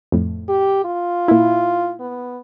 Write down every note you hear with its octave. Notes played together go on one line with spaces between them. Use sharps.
F2 A2
G4
F4
A#2 E4
B3